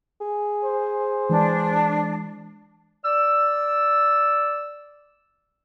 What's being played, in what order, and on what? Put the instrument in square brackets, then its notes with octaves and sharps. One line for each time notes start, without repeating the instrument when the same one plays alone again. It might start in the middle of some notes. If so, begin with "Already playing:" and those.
[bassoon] G#4
[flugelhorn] C5
[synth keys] E3 G#3 [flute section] D4
[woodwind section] D5 E6